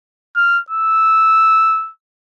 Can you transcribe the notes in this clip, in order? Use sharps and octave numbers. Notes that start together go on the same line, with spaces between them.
F6
E6